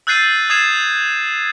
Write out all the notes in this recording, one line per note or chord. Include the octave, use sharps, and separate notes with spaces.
E6 F#6 G6 A6 C7 D#7
D#6 G#6 A6 C7 E7